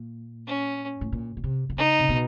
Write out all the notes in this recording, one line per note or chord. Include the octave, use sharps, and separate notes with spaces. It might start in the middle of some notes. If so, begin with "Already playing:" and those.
Already playing: A#2
C#4
A2
A#2
B2
C3
D3
C#3 D#4
C3
B2